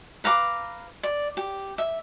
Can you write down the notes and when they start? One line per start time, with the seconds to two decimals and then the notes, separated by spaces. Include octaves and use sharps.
0.24 B4 F5 A#5 D6
1.03 D5
1.37 G4
1.78 E5